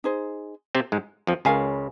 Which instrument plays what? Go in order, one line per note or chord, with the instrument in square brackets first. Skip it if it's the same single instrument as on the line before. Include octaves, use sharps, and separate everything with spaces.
[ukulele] D#4 G#4 C5
[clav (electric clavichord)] C3 C4
G#2 G#3
F2 F3
[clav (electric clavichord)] C#2 C#3 [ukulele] A#4 F5 G#5